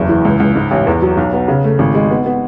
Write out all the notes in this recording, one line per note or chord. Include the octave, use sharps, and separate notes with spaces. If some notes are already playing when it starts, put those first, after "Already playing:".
Already playing: F#1 E2
E3
C#2
C#2
G#2
A1
E2
F#3
B1
B3
C#3
A3
G#1
G#3
B3
B3